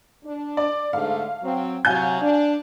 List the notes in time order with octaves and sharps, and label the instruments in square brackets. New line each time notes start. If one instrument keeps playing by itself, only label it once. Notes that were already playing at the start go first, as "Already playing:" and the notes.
[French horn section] D4
[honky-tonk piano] D5
[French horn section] G#2 D3 A3 [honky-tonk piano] F5
[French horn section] F#3 C4
[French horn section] C3 F#3 [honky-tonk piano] F5 G#5 G6
[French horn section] D4